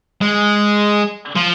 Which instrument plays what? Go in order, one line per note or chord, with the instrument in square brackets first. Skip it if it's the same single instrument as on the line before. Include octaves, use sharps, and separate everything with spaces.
[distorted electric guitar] G#3
F3